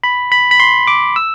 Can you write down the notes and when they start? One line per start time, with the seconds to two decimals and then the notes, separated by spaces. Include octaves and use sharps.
0.04 B5
0.32 B5
0.51 B5
0.60 C6
0.87 D6
1.16 E6